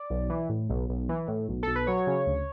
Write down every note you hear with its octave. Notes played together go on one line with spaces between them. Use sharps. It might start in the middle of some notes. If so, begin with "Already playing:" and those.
Already playing: D5
B1
E3
A2
B1
B1
E3
A2
B1
B1 A4
B4
F#3 C#5
C#3
D2